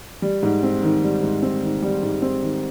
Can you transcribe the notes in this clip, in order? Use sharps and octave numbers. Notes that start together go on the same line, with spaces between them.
G3
G#2
C4
D#3
G3
G#2
C4
D#3
G3
G#2
C4
D#3